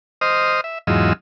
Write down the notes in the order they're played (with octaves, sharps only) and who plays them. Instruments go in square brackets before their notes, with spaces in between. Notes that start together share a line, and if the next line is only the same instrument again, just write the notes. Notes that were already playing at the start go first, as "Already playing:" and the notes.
[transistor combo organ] C5 D#5 D#6 F6
E5
E2 G#2 F#3 F4 D#5 E6